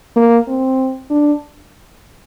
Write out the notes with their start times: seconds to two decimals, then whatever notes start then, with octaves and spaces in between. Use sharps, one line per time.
0.16 A#3
0.48 C4
1.10 D4